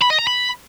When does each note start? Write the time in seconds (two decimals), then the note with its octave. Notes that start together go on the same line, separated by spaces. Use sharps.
0.02 B5
0.10 D#5
0.19 A#5
0.27 B5